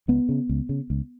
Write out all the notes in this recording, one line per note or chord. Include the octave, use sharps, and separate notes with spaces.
C#2 B3
C#3
C#2
C#3
C#2